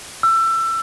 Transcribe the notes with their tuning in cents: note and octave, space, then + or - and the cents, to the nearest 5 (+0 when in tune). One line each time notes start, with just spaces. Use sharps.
E6 +25